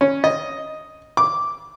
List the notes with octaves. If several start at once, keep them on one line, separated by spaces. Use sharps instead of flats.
C#4
D#5
D6